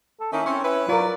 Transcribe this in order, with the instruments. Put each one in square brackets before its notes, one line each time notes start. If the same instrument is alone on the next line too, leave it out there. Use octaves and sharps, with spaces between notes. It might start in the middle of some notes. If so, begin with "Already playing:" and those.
[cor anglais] A4
[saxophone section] D#3 A#3 D#4 [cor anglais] C#4 [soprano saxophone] E4
[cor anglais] C4 [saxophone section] C#4 [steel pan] C#6
[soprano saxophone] C#4 [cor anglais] E4 [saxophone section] B4
[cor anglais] F#3 [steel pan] F4 A#4 [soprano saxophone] D5